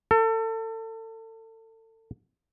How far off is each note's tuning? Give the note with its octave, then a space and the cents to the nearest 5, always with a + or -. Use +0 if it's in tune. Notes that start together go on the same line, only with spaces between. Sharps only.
A4 +30